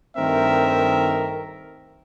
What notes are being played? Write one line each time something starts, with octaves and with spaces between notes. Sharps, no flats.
G2 D#3 A3 C4 A#4 E5